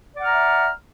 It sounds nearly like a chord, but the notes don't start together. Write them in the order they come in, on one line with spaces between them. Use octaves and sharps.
D5 F#5 F6 A#5 E5